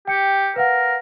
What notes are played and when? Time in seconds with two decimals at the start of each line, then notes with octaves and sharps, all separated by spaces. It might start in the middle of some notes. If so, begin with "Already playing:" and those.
0.08 G4 G5 C#7
0.56 A#4 B4 F5 F#5